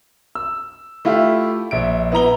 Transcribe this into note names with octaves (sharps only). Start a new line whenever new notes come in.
E6
A3 E4 F4 G4
A#1 E5 D7
B3 E4 A#5 G7